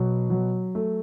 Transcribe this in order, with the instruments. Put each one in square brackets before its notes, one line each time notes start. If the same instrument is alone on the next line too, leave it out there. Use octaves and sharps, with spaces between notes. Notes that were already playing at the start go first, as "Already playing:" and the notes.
Already playing: [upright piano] B2 F#3
F#3
A3